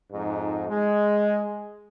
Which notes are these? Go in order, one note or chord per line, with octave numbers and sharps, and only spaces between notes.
F2 G#2 D#4
G#3